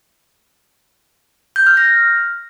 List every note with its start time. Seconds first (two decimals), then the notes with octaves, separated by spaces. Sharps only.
1.56 G6
1.67 F6
1.77 A#6